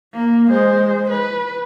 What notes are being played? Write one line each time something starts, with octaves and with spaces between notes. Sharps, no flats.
A#3
G#3 C5
B4